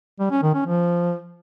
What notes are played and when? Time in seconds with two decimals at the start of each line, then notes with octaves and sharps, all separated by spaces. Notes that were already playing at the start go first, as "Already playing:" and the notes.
0.19 G3
0.31 C#4
0.42 D#3
0.54 C#4
0.65 F3